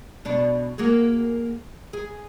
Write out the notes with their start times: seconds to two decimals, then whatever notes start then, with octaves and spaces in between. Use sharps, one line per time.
0.25 B2 D4
0.78 A#3 F#4 G#4
1.93 G#4